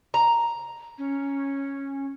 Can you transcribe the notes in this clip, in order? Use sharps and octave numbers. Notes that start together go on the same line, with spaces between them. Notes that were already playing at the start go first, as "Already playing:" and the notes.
A#5
C#4